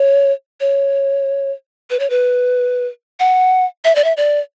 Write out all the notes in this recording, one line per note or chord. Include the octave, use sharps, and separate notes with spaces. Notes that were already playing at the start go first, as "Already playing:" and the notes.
Already playing: C#5
C#5
B4
C#5
B4
F#5
E5
D5
E5
D5